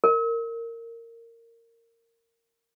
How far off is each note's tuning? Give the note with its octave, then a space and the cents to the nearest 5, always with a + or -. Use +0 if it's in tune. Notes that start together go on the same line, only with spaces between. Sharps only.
A#4 -15